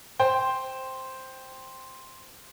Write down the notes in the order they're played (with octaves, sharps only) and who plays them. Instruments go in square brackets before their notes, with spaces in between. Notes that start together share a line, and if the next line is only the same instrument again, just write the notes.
[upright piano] C5 G5